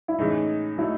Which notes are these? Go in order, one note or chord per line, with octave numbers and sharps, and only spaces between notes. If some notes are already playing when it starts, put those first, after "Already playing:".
E4
A2 E3 G#3 C#4 D#4 G#4
F#3 A3 D#4 E4